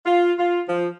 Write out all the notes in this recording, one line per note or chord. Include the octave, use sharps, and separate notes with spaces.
F4
F4
F3